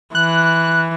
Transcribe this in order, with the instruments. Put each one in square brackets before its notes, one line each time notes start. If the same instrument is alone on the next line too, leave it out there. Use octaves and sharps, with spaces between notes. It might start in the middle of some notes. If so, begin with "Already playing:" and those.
[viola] E3 [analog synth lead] F#6